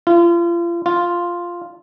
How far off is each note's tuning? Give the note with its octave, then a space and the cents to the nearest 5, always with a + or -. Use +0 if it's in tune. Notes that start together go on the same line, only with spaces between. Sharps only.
F4 -35
F4 +0